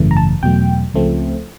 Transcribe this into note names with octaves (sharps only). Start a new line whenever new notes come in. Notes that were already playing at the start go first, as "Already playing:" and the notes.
Already playing: G#1 F#2 C#3 E3 A3
A#5
A5
E2 B2 F#3 A3 G5
C#2 C#3 F3 A3 C4